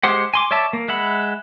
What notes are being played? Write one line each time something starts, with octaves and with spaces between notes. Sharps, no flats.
G#3 G4 C5 F#5
G#5 C6 D6
C#5 D5 E5 A5
A#3
G#3 E5 F#5 B5